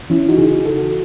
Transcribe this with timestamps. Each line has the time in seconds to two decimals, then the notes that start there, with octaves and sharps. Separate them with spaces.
0.10 E3 C#4 E4
0.28 D#4 F#4
0.38 C#3 G#4
0.47 D#4 F#4
0.65 E3 F#4 A4